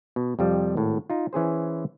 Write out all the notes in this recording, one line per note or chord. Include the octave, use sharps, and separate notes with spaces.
B2
F2 C3 F3 G3
G#1 A2
D#4 F4
E3 C#4 G#4 C5